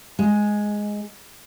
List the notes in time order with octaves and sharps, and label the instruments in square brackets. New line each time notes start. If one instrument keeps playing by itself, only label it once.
[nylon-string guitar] G#3